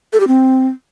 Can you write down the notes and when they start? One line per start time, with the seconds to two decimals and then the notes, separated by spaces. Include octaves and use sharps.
0.13 A4
0.20 G4
0.28 C4